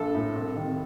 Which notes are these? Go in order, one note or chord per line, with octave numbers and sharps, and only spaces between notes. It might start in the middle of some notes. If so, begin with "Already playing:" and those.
Already playing: A#1 A4
A2
C2
C3 D#3